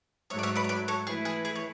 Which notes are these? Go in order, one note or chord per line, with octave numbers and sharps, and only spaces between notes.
G#2 F#3 A3 C#5 E5
D5
C#5 E5
B4 D5
C#5
B4 D5
A4 C#5
E3 A3 E4 G#4 B4
G#4
G#4
C#5